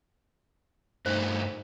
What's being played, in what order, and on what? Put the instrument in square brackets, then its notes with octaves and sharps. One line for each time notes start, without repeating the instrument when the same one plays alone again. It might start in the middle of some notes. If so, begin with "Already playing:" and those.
[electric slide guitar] G2 A3 D#4 [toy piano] C5